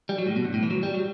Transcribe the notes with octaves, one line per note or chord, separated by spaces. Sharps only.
G3
F#3
A2
B2
G2
A2
E3
F#3
G3
F#3